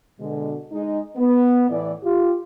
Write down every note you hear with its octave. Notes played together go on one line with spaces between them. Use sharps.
B2 D3 G#3
G#3 D#4
B3
A2 E3 D5
F4 G4